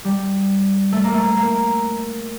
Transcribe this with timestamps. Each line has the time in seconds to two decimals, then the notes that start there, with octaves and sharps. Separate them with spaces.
0.05 G3
0.92 A3
1.03 A#3
1.14 A3
1.36 A#3